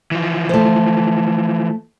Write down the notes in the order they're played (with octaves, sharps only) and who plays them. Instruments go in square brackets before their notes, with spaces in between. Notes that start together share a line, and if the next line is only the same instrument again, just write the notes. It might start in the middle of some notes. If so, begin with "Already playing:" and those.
[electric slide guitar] E3 F3
[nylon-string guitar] A3 C5